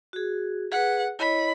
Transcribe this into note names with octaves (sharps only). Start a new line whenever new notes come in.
F#4 G#4
G#4 B4 F#5
E4 C#5 D#5 B5